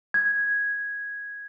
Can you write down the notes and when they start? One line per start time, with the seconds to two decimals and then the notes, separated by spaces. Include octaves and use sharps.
0.14 G#6